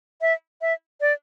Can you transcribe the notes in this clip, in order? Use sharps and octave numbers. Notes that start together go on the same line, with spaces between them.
E5
E5
D5